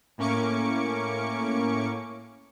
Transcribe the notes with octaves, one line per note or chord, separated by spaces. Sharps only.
A2 A#3 C#4 C#6 D6 C#7